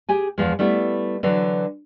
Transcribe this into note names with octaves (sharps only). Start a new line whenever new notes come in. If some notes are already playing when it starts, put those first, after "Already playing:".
G4 G#4 G#5
E2 F3 G#3
G3 A3 B3 E4
D3 E3 F#3